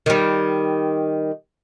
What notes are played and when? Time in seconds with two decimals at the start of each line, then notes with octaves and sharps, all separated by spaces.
0.06 D#3 G3